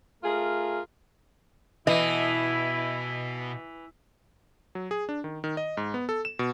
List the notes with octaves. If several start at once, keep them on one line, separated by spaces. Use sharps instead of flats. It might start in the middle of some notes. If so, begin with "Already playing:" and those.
A3 F4 G#4 A#4
B2 E3 E4 D#5
F#3
G#4
D4
D#3
D#3
D#5
G#2
B3
A4
E7
B2